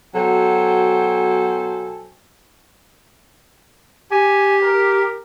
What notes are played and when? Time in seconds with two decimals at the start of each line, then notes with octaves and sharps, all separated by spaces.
0.14 B2 F#3 A4 C5 G5 G#5
4.11 G4 G#5
4.63 A#4